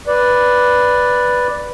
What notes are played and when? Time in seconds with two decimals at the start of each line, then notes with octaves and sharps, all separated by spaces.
0.07 B4 D5